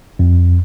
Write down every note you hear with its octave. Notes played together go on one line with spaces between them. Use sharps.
F2